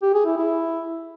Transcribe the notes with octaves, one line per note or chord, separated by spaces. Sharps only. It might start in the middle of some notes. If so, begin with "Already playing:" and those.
G4
G#4
E4
E4